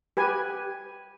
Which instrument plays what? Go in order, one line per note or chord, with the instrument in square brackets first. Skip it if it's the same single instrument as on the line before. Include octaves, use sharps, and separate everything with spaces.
[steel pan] G4 B4 G#5